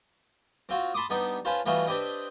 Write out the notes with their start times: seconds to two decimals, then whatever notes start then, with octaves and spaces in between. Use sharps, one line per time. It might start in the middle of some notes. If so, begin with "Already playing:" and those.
0.69 C4 F4 F#4
0.94 A5 B5 C6 D6 D#6
1.10 G3 B3 D4 D#4 G4
1.45 C#4 F4 B4 C5 A5
1.66 E3 G3 A3 F4 F#4 D#5
1.87 C4 D4 G4 B4 D#5 G5